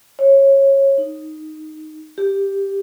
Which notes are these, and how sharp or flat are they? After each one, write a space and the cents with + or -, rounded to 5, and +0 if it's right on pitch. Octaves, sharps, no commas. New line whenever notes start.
C#5 -20
D#4 -5
G4 +5